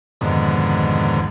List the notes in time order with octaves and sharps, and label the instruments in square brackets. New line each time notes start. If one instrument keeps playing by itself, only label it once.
[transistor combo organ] F2 G#2 B2 D3 D#3